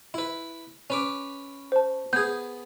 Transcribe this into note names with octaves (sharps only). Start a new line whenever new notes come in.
E4 B4
C#4 B4 D6
C5 A5
B3 G#4 G6 G#6